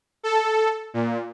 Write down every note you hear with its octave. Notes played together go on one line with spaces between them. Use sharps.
A4
A#2